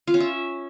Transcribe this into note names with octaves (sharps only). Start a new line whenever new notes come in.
F4
C#4
E5